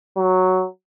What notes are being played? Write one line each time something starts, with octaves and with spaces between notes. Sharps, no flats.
F#3